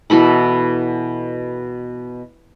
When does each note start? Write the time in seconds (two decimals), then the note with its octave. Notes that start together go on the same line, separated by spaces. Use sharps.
0.10 B2 E3 A4 B5